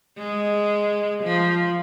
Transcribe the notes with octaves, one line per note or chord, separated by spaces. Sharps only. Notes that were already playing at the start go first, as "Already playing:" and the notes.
G#3
F3